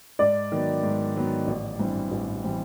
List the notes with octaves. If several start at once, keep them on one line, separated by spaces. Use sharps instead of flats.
G#2 D5
D#3 F#3 B3
G#2
D#3 F#3 B3
A1
G2 E3 G3 C4
A1
E3 G3 C4